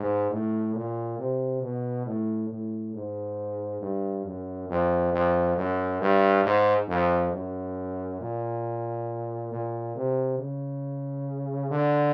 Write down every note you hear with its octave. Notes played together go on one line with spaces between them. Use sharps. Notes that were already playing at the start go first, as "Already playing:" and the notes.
Already playing: G#2
A2
A#2
C3
B2
A2
A2
G#2
G2
F#2
F2
F2
F#2
G2
G#2
F2
F#2
A#2
A#2
C3
C#3
D3